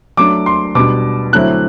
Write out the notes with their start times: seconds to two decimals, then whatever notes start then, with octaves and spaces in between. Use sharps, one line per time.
0.17 F#3 A3 D4 D6
0.46 C6
0.75 B2 G3 D4 D6
1.33 D3 F#3 A3 C4 E4 F#6